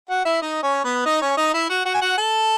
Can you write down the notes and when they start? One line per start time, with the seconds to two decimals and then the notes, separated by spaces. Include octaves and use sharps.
0.09 F#4 F#5
0.25 E4 E5
0.41 D#4 D#5
0.63 C#4 C#5
0.84 B3 B4
1.06 D#4 D#5
1.21 C#4 C#5
1.37 D#4 D#5
1.54 E4 E5
1.69 F#4 F#5
1.85 F#4 F#5
1.94 G#5
2.01 F#4 F#5
2.18 A4 A5